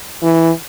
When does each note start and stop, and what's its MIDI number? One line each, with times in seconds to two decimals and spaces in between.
0.23 0.51 52